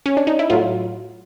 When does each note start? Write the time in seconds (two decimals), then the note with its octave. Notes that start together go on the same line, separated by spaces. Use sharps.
0.06 C#4
0.17 D4
0.27 D#4
0.39 E4
0.50 A2 F#3 F4